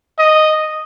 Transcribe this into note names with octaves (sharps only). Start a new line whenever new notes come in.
D#5